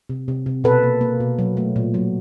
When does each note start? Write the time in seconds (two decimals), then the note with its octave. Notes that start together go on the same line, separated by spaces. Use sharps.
0.09 C3
0.28 C3
0.46 C3
0.64 B2 A4 B4
0.83 A#3
1.01 A#3
1.20 B2
1.39 F#3
1.57 A3
1.76 A#2
1.94 F#3